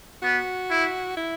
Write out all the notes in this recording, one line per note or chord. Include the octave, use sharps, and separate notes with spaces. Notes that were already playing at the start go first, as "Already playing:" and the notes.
B3 F#4
E4
E4